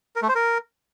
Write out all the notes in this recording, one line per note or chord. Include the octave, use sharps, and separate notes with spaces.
A#4
A3
C5
A#4